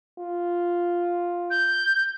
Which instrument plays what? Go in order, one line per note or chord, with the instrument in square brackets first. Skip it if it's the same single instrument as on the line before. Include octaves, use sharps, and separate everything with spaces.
[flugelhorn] F4
[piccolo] G6